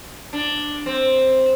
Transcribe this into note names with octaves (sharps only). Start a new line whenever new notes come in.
D4
C4